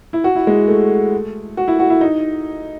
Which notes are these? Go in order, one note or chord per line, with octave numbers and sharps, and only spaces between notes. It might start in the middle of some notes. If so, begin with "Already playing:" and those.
E4
F#4
E4
G#3
A3
F#4
E4
F#4
E4
D#4